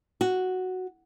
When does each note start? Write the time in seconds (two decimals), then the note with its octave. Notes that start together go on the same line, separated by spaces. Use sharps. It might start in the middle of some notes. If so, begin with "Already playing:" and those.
0.21 F#4